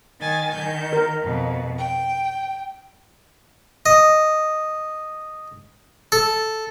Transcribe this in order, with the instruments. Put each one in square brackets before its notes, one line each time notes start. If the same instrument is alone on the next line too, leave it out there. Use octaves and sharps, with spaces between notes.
[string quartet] D#3 G#5 A6
D#3 G6
[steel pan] A#4
[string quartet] F2 B2
G5
[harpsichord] D#5
A4